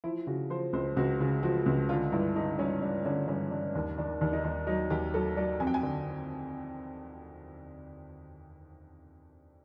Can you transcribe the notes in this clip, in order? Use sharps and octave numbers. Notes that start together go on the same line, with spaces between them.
F3 E4
C#3 F#4
F3 C5
C#2 C5
C#2 F#4
C#3
F3 F#4
C#2
D3 F4
G2 E4
D3 D#4
G2 C#4
G2 D4
D3 C#4
G2 C#4
G2 D4
D#2 D4
D#3 D4
D#2 D4
D#4
D#2 D4
F#3 D#4
D#2 G4
F#3 A4
F#3 D5
F2 G#5
G5
G#5
D3